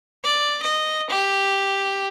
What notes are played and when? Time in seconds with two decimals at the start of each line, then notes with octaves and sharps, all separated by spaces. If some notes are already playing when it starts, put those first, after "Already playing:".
0.24 D5
0.62 D#5
1.10 G4